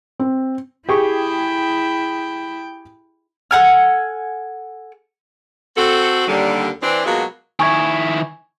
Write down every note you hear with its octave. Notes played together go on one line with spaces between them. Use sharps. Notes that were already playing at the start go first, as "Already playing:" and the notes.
C4
E4 G4 G#4 G5 C#6
A4 F#5 G#5 F6
C4 F#4 A4
D#2 D3 G3
E3 C4 D4
B2 F#3 G#3 A#3 F4 F#4
D#3 E4 G#5 C#6 G#6